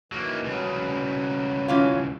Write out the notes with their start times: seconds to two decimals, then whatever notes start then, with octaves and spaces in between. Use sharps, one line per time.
0.12 D#3 E3 F#3 A#3
0.44 C2 C#3 F#3 B4
1.68 E3 C#4 F4